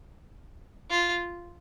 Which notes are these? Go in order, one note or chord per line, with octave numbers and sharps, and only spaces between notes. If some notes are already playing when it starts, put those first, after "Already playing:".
F4